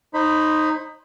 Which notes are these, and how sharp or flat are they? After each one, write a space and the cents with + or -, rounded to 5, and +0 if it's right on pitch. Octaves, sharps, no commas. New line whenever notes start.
D#4 -5 C5 +25 B5 +10